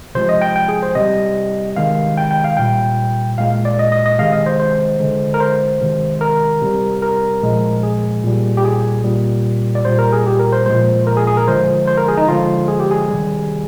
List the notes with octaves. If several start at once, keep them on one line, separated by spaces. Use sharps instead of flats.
C3 F3 G#3 C5
D#5
G5
G5
G#4
C5
C3 G3 D#5
C3 D#3 G#3 F5
G5
G5
F5
A#2 G3 G5
A#2 G#3 F5
D5
D#5
D#5
D#5
C3 D#3 G#3 F5
D#5
C5
C5
D3 G#3
A#4
C5
C3 D#3 G#3
A#4
C3 G3
A#4
A#2 F3 G#3
G#4
A#2 G3
G4
G#4
A#2 G3
D5
A#2 G3 C5
A#4
G#4
G4
A#4
C5
A#2 F3 G#3 C5
A#4
G#4
G#4
A#4
D3 F3 G#3 C5
C5
A#4
G#4
D#4
D3 F3 G#3 F4
G#4
G4
G#4
C3 D#3 G3